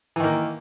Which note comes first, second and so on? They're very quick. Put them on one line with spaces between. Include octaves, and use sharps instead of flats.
E3 D#3 A#3